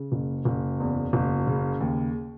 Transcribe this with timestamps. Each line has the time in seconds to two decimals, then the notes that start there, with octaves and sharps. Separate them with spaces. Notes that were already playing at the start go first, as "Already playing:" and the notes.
Already playing: C#3
0.12 F#1
0.45 F#1
0.80 E2
1.13 F#1
1.47 C#3
1.80 D#2